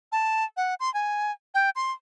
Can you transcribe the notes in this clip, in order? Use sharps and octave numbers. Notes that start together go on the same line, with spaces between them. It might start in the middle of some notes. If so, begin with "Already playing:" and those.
A5
F#5
C6
G#5
G5
C6